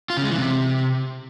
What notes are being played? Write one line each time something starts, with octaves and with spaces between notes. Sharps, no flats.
F4
C#3
G#3
E3
C3